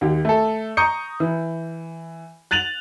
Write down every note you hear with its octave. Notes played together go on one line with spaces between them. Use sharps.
D#2 G4
A3 A4
A#5 C#6 D#6 G6 C#7
E3
F#6 A6 D#7 F7 F#7